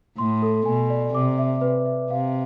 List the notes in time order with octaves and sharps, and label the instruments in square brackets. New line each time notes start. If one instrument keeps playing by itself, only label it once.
[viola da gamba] A2 [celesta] C6
[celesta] A4
[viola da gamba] B2 [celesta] G#5
[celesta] D5
[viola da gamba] C3 [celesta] D6
[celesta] E5
B4
E5
[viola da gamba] C3 [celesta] F5